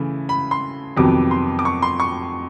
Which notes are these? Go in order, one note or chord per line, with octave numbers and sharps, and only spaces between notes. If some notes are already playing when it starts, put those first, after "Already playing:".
Already playing: C#3 E3 A3
B5
C6
F2 C3 D#3 F#3 B3 D6
C6
D6
C#6
C6
C#6